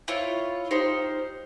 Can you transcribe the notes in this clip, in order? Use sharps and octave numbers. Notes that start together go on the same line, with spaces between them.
E4 F4 C#5
D#4 G4 C5 F5